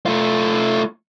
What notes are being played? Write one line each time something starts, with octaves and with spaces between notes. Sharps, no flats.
A3 F4